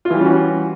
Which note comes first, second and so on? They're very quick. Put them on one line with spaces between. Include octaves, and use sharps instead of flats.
F4 E3 G3 C#4 F#4